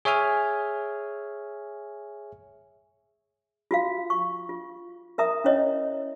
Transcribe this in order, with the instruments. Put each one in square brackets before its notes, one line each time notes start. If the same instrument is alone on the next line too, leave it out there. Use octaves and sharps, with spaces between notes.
[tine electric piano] G#4 C#5 E5 G#5 F6
[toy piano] F4 F#4 F5
C#6
F4
A#4 E5 A#5 D#6
C#4 E4 C#5 D#5